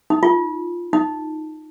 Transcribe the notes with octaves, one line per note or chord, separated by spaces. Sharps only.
D#4
F4
D#4